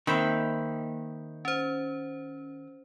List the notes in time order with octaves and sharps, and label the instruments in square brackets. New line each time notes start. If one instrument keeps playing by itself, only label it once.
[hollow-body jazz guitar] D#3 C4 [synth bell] A#3 [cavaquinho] E5 G5 B5
[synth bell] C#4 C5